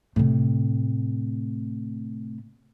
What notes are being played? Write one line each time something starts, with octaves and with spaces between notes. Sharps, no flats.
A2 C3